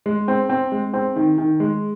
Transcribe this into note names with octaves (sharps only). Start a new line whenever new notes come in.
G#3
C4
C4
G#3
C4
D#3
D#3
G#3